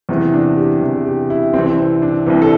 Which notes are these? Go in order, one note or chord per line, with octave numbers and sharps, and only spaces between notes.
E2 C3 E3
D4
G4
E2 C3 E3
G4
E4
C2 C3 E3 C4
C4
D4
C2 C3 E3 G4
A4